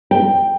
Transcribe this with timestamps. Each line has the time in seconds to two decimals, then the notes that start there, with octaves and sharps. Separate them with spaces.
0.11 G5